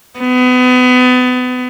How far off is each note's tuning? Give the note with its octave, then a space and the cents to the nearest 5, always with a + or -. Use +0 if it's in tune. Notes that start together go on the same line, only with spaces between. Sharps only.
B3 +30